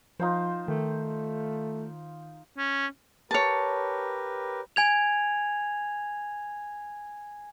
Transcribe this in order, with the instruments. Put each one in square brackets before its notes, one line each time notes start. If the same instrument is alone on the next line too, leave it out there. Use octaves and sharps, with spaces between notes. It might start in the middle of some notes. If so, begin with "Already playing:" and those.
[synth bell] F3 [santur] D#4 F4 C5
[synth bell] D#3 [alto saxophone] A3
[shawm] C#4
[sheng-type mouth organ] G4 A#4 B4 [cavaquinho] C#5 A5
[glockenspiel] G#5 G#6 F7